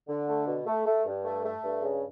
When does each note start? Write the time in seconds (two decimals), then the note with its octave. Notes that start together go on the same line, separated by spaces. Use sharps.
0.09 D3
0.28 A3
0.47 B2
0.67 A3
0.86 A3
1.05 G2
1.25 A3
1.44 A3
1.63 G2
1.82 C#3